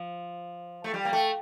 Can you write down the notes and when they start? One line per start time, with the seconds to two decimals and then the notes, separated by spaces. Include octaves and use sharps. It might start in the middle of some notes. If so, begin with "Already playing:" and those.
Already playing: F3
0.84 A3
0.94 G3
1.05 A#3
1.13 A3